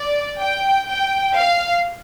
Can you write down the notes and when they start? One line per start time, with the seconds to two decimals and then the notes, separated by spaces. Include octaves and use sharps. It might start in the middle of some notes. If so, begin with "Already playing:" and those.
Already playing: D5
0.40 G5
0.88 G5
1.36 F5